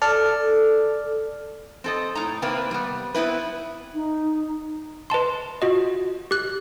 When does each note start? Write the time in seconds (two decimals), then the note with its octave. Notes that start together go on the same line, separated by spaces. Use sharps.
0.02 A4 D5 F6
1.84 C4 A4 D#5
2.15 A2 D#4 A#5
2.42 C3 A#3 C4 B4
2.71 G3 B3
3.14 B3 C4 E4 B4
3.94 D#4
5.10 B4 D#5 A5 C6
5.62 F4 F#4 D#5
6.31 G4 F#6